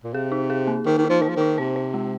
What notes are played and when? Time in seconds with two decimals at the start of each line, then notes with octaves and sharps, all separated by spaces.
0.04 A#2
0.13 C3 G#4
0.32 D#4
0.50 G#4
0.67 A#3
0.86 D#3 D#4
0.98 D#3
1.04 D#4
1.10 F3
1.22 D#3 C5
1.29 F3
1.37 D#3 D#4
1.58 C3 C5
1.76 C5
1.94 G#3